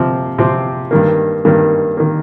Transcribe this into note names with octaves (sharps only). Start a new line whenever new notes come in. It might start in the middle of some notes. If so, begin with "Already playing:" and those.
Already playing: C3 F3 C4
C3 F3 C4
G2 D#3 A#3
G2 D#3 A#3
D#3 A#3